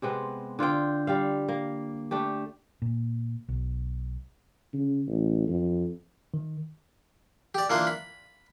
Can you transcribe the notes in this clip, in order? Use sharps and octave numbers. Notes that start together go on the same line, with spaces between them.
C3 G#3 B3 C4
D3 F4 C5 G5
G3 G4 F5
A#3
A3 D4 G4
A#2
B1
C#3
A1
F2
D#3
G4 D5
E3 A#3 D4 F4
B5